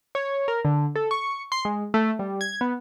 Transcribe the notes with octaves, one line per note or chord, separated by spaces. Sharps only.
C#5
A#4
D3
A4
C#6
C6
G#3
A3
G3
G#6
B3